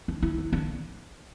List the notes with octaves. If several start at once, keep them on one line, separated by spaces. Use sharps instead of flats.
D4
E4
D4
D4